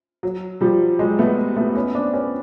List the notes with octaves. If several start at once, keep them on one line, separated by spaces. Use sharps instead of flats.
F#3
F3 G3
F#3 G#3
A3 B3
A3 B3
B3 C#4
C4 D4
B3 C#4